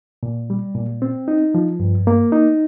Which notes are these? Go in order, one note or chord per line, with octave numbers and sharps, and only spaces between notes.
A#2
G3
A#2
C4
D#4
F3
G2
A#3
D#4